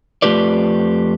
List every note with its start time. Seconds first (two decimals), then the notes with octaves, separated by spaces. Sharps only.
0.22 F2 A3 F4 G4 B4 D5